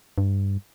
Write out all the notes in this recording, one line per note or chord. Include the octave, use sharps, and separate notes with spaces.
G2